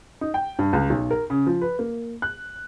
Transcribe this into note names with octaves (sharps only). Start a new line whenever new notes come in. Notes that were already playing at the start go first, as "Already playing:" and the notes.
D#4
G5
G2
C#2
B1
A#4
C#3
F3
B4
A#3
F#6